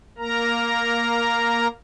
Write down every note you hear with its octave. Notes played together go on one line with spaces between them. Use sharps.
A#3 A#4 A#5